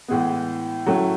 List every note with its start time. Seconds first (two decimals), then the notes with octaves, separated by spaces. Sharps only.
0.08 A2 E3 G#3 B3
0.86 A2 F#3 A3 C#4